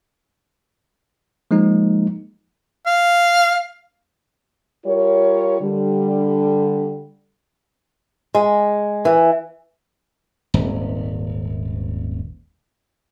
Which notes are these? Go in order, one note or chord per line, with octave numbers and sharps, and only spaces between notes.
F3 G#3 A#3 D#4
F5
G3 F4 A#4 C#5
D3 G3
G#3
E3
D#1 G#1